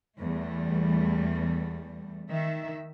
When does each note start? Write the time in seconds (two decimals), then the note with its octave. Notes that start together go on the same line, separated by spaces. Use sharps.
0.20 E2 G3 A3
2.29 D#3 E5